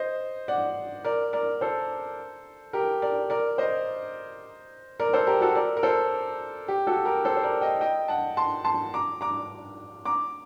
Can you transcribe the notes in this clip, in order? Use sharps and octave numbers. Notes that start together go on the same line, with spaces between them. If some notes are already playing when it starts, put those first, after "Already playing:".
Already playing: C5 D#5
D5 F#5
A#4 D5
A#4 D5
A4 C5
G4 A#4
A#4 D5
A#4 D5
C5 D#5
A#4 D5
A4 C5
G4 A#4
F#4 A4
A#4 D5
A#4
A4 C5
G4
F#4 A4
G4 A#4
A4 C5
C5
A#4 D5
D#5 G5
D#5 G5
F#5 A5
A5 C6
A5 C6
A#5 D6
A#5 D6
A#5 D6